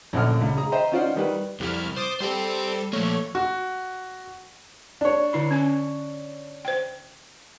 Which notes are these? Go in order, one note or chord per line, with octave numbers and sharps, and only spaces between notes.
A#1 F#2 D3 F6
C#2
G#4 A#5
C5 D#5 E5 G5 A#5
C#4 D#4 F4 C5 D5 F#5
D#3 G3 B4
C2 F2 G3 E4 F6
C5 D6 D#6 A6
G3 G4 A4 C5 G5
F3 A3 A#3 C#5
F#4
D4 C#5
D3 E4 B5
C#4 G#5
C5 G5